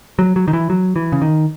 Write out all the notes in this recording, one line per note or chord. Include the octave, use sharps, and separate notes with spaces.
F#3
F#3
D#3
E3
F#3
E3
C#3
D#3